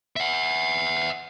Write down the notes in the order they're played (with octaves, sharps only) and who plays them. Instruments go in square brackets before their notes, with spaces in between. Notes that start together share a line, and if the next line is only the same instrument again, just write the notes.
[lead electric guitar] E5 F#5